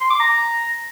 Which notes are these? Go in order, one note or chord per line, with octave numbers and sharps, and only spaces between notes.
C6
D6
A#5